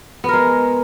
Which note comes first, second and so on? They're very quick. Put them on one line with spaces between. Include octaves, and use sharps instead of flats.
B3 A#4 G#3